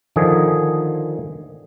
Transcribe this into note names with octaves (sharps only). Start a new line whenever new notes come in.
D3 D#3 F3 G#4